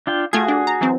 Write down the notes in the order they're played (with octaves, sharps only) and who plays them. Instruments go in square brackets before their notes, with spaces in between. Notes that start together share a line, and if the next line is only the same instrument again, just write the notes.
[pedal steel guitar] D4 F4 G5
[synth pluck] A3 F4 G#6 [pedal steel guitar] F#4 G#4
[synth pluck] D4
A#5
E3 F#3 C4